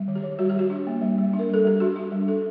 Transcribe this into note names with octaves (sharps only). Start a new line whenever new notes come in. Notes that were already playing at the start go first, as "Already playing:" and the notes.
Already playing: G3
D#3
G4
D#3
G3 F#4
G4
G3 F#4
D4
A#3
G3
G3
D4
A#4
G3 A4
G3 G4
D4 F#4
D4
G3
D4 A4